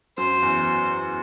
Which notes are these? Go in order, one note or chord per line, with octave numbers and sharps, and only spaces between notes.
F#2 F#3 C5
E2 E3